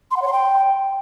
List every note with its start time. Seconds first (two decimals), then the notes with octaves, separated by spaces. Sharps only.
0.11 C6
0.16 F#5
0.22 C#5
0.27 C6
0.32 G5